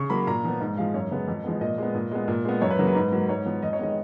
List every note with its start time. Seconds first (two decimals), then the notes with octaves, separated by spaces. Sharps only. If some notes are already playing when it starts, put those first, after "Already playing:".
Already playing: C#3 C#6
0.10 F#3 A#3 B5
0.27 A#2 A#5
0.44 F3 B3
0.61 G#2
0.77 F3 G#3 F5
0.94 F#2 C#5
1.11 C#3 G#3 B3
1.28 F2
1.44 F3 G#3 B3
1.61 A#2 D#5
1.78 G#3 B3
1.95 A#2
2.11 G#3 B3
2.28 A#2
2.45 G#3 B3
2.62 F#2 C#5
2.70 B4
2.79 C#3 F#3 A#3
2.87 B4
2.95 G#2
3.12 F#3 A#3
3.29 G#2 C#5
3.46 F3 B3
3.62 F2 D#5
3.73 C#5
3.79 D#3 G#3 B3 D#5